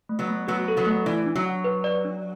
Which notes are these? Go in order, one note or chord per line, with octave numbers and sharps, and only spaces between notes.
A3
F#3 B3
A3
F#3 B3 F#4
A4
F#3 B3
A3
E3 D5
D4
F#3
F#5
B4
D5
D4